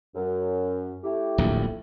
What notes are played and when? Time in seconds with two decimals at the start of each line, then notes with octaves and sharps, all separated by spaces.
0.15 F#2
1.04 A3 E4 G4
1.38 D1 A#1 D#2